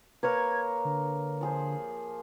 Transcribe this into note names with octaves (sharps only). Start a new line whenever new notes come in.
A#3 A#4 B4 C#5 G#6
D3
F3 G#4 C5